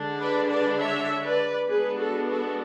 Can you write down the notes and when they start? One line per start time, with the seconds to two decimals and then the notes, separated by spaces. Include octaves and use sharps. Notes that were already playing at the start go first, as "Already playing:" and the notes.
Already playing: D3 G#3 D4
0.20 B4 D5
0.49 B4 D5
0.79 C#5 E5
1.23 B4 D5
1.68 G#3 B3 D4 G#4 B4
1.98 F#4 A4
2.28 F#4 A4